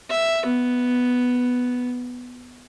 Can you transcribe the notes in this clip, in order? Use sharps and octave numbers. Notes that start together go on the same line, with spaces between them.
E5
B3